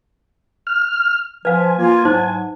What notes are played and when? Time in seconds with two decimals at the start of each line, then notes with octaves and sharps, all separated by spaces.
0.67 F6
1.45 F3 B4 F5 G#5
1.78 A#3 F4
2.05 G#2 F#3 D#4 C5